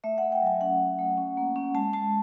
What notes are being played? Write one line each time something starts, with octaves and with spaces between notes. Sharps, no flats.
A3 E5
A3 F#5
G5
F#3 G#5
C#4 F#5
C#4
A3
C#4
A#3
C#4
G#3 A5
G#3 A5